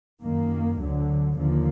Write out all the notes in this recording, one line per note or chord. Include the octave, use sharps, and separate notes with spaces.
F#2 D#3 A#3
D2 D3 F#3
D#2 D3 F3 A#3